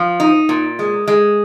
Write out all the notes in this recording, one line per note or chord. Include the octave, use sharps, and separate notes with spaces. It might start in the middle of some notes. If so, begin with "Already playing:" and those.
Already playing: F3
D#4
A#2
G#3
G#3